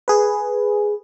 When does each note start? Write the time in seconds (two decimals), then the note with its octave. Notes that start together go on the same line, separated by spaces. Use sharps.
0.08 G#4 B4